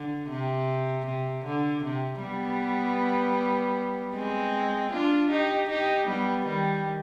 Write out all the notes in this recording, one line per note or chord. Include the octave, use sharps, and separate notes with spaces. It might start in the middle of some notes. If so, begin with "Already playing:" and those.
Already playing: D3
C3
C3
D3
C3
G3 B3
G#3 C4
D4 F4
D#4 G4
D#4 G4
G3 B3
D#3 G3